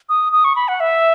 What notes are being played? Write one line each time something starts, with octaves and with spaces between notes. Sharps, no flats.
D#6
D#6
C#6
B5
F#5
E5